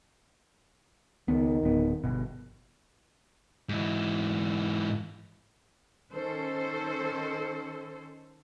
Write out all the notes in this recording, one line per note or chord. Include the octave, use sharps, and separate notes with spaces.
C#2 D#3 B3
D1 B3
G1 B2
G#2 E3
D#3 C#4 A4 C5